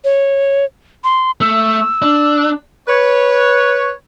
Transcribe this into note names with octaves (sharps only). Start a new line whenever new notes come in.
C#5
C6
A3 E6
D4
B4 C#5